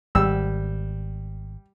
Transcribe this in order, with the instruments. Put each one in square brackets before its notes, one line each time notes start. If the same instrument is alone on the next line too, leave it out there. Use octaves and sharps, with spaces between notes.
[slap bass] G#1 [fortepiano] G3 E6